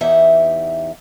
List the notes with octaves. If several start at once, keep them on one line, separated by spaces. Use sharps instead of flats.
E2 E3 D#4 G4 E5 F#5